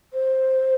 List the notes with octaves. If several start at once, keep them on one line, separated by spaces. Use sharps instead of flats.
C5